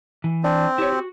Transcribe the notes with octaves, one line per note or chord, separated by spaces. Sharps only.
E3
C4 D4
E4 G4 C#5
F#4